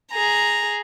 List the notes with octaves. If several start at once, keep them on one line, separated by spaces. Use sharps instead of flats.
G#4 A#5